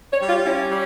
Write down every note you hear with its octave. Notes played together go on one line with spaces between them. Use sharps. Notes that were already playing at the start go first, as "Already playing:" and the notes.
C#5
G3
F4
C#4 E4
G3